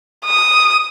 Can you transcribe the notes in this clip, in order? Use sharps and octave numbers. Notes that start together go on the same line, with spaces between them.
D#6